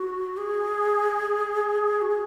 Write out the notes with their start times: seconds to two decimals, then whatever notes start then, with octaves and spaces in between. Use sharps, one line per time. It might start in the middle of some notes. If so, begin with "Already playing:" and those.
Already playing: F#4
0.37 G#4
2.02 F#4
2.09 G#4